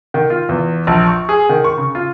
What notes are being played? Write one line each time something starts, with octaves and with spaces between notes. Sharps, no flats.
D#3
F4
E2
A#1
C#6
G#4
D#3
C#6
C#3
F4